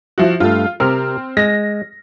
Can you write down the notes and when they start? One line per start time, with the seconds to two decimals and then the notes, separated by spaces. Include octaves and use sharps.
0.18 F3 E4 F#4
0.40 G2 A3 F4
0.80 C3 C4 A#4 F6
1.37 G#3 A#6